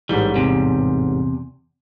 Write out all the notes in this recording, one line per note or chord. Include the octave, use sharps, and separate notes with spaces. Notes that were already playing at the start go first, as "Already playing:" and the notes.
A1 G#2 E3 G3
E2 C3